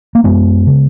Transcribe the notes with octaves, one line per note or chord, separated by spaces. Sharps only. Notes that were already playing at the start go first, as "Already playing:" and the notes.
A#3
F#2 G#3 B3
C#3